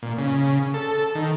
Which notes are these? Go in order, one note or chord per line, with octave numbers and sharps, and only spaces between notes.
A#2
C#3
A4
D#3